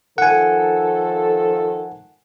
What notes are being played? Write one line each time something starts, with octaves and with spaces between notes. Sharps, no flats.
D#3 F3 A4 F#5 G#5